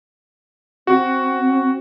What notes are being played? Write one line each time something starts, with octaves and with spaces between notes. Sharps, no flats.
C4 F#4